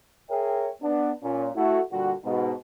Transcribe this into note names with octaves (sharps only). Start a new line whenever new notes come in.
G#4 A#4 C#5 E5 G5
B3 D4
A#2 C#4
A3 E4 F#4
A#2 D3 G3 F#4
G#2 B2